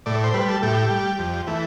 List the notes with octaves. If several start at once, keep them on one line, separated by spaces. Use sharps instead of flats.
A2 D5
C5
G3 B4
A4
A2 G4
G3
F2
E3 A3